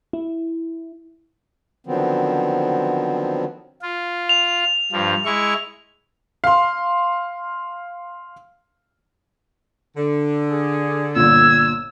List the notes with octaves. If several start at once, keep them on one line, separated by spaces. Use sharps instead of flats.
E4
D3 D#3 F3 F#3 B3 C4
F4
F7
G2 F3
G#3 E4 C#6
F5 C6
D3
G#4
G1 A#2 E6 G#6